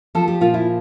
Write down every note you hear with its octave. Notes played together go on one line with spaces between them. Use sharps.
F3 A4
G4
A#2 F4
E4